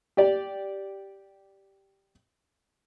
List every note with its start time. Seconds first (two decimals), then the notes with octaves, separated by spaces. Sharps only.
0.17 G4 D5